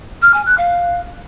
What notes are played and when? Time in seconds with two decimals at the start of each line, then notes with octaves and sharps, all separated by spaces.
0.21 F6
0.33 G#5
0.45 F#6
0.57 F5